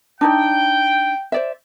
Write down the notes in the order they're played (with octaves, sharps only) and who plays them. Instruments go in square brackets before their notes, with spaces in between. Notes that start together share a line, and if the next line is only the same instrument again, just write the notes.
[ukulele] D4 D#4 D5 [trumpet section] G5
[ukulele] C5 D5 E5